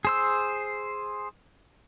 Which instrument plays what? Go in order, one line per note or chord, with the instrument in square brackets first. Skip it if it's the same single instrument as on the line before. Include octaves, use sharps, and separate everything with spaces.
[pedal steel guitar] G#4 C5 E6